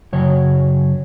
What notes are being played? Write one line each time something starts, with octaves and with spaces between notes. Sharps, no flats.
F#2 C#3 F#3 C#5